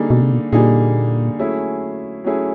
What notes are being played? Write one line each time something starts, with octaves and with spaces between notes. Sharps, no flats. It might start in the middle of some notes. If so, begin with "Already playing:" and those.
Already playing: D3 G3 A#3 D#4 G#4
B2
C3
B2
A#2 D3 G3 A#3 D#4 G#4
F#3 A3 C#4 E4 G#4
F#3 A3 C#4 E4 G#4